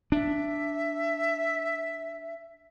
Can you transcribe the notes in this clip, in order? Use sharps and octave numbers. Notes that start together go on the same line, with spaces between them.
D4 E5